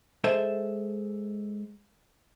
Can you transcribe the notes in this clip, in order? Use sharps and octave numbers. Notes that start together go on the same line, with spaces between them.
G#3 A4 C5 E5